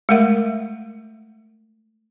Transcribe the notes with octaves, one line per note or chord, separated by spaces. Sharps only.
G#3 A3 A#4 E5 F#5